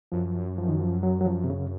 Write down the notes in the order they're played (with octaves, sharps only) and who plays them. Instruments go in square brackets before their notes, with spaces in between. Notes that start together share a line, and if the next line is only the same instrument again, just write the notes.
[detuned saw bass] F#2 [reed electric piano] F3
[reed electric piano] F3
D#3
F3
F#3
F#3
F3
C3
C#3